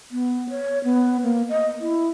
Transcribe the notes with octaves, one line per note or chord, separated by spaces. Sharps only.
B3
C#5
B3
A#3
D#5
E4